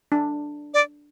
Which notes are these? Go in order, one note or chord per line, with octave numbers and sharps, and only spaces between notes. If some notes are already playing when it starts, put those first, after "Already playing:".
D4
D5